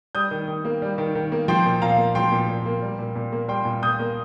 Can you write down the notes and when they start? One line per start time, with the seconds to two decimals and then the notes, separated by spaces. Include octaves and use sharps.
0.15 G3 D#6 G6
0.31 D#3
0.48 D#3
0.65 A#3
0.82 G3
0.98 D#3
1.15 D#3
1.32 A#3
1.48 F3 G5 C6
1.66 A#2
1.82 A#2 F5 A#5
1.98 A#3
2.15 F3 G5 C6
2.32 A#2
2.49 A#2
2.66 A#3
2.82 G3
2.99 A#2
3.15 A#2
3.32 A#3
3.48 G3 G5 C6
3.65 A#2
3.83 A#2 D#6 G6
4.00 A#3